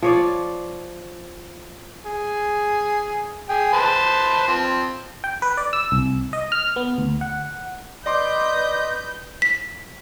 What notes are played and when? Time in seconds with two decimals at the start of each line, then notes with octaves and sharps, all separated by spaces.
0.03 F3 F4 C#5 D5
2.05 G#4
3.49 G#4 G5
3.73 B4 C5 A5
4.48 F3 C4
5.24 G5
5.42 B4
5.57 D5
5.73 E6
5.92 C2
6.33 D#5
6.52 F6
6.76 B3
6.98 D2
7.21 F#5
8.06 B4 D5 D#5 C6 D6 G6
9.42 B6